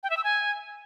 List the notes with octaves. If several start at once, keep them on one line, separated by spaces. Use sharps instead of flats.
G5
E5
E6
G#5